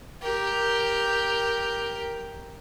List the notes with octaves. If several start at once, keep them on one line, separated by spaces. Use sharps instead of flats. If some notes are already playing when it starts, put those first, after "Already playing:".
G4 A#4